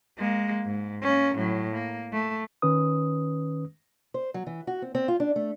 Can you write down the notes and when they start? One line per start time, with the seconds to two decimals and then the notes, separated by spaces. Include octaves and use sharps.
0.18 G#3 A#3
0.65 G#2
1.03 A#3 C#4
1.35 A2 F#3
1.74 A#3
2.12 A3
2.62 D#3 C#4 B4 D#6
4.14 C5
4.34 F#3
4.47 E3
4.67 F#4
4.82 C4
4.95 C4
5.08 F4
5.20 D4
5.36 A3